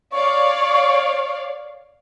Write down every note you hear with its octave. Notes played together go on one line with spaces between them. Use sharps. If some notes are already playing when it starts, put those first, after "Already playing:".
C#5 D5 F5 C#6